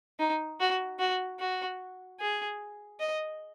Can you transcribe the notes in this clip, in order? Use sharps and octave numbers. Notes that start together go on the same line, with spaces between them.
D#4
F#4
F#4
F#4
G#4
D#5